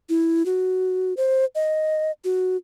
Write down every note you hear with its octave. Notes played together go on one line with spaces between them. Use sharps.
E4
F#4
C5
D#5
F#4